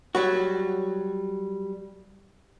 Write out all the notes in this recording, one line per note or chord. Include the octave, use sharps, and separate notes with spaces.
F#3 G3 F#4